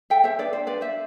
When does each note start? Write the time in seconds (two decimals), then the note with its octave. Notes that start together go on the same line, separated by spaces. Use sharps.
0.10 A4 E5 G5
0.24 C5 E5
0.39 D4 B4 D5
0.53 C5
0.67 D4 B4 D5
0.81 C5 E5